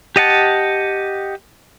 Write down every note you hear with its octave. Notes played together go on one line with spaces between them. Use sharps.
G4 D#5 F#5 A5